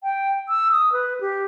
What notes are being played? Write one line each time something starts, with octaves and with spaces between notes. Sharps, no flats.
G5
E6
D#6
B4
G4